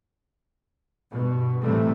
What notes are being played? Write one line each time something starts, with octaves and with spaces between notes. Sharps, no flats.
G2 B2
A2 C3 E3 G3 A3